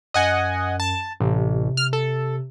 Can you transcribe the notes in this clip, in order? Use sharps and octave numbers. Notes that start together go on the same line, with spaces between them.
F#2 D#5 F#5 G#5
A5
A1 C3
F6
A4